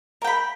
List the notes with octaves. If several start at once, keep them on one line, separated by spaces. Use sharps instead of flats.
A#4 G5 B5